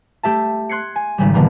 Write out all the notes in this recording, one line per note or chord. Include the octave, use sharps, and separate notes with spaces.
A3 G4 E5 A5
C6 F#6 G#6 C7 C#7
G#5
G#1 C#3 G3
B2 D3 E3 G3 A#3 B3